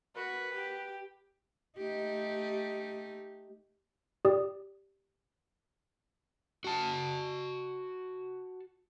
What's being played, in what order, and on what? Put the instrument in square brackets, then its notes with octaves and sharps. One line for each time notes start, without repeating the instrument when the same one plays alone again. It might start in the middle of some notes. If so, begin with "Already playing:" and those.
[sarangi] F#4 [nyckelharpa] B4
[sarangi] G4
[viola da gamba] A3 D#4 G4
[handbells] G4 D5 D#6
[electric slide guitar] F#4 A5